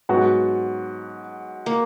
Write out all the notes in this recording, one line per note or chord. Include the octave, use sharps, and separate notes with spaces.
G#2 F#3 B3 F#4
A#3